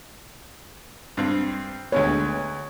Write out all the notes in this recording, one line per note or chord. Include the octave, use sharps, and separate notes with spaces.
G2 C4
D2 G#3 B3 C#5